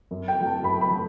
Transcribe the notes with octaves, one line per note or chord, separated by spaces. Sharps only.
F#2
G5
F#3 A3
A5
F#2 B5
B5
F#3 A3